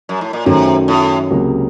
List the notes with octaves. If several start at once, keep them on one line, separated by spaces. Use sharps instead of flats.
F#2
A2
A#2
F#2 C3 D#3 F#3 A3 C#4
A2
C#2 C3 F#3 A#3 C#4